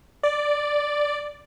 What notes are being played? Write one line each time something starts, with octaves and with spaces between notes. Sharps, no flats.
D5